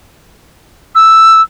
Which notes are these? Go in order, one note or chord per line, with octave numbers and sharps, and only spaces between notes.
E6